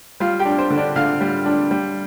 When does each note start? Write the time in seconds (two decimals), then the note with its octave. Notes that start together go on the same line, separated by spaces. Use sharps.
0.20 G3 F4 F5
0.40 G4 G5
0.45 D4
0.58 C5
0.70 D3
0.77 D4 D5
0.96 D3 F5 F6
1.21 G3
1.46 D4
1.71 G3